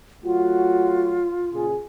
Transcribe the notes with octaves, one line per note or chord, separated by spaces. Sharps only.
F#3 A3 F4 F#4
A#2 C#3 G#4